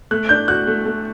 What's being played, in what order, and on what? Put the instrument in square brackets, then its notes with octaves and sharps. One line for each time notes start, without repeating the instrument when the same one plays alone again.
[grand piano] A3 [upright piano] F#6
[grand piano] D4 [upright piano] G6
[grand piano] F#4 [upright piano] F#6
[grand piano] A3
A3